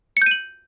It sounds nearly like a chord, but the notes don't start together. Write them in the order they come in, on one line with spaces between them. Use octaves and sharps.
C#7 G6 D#7 F#7